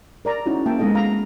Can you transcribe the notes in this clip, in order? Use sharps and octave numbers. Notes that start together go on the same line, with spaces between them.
A#4 D5 A#5
C#4 D#4 E4 F#4
A#3 E5 G5 A5
G#3 B3 D#4 A4 D#5
F5 A#5 B5